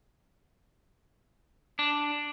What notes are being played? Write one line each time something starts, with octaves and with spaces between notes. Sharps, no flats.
D4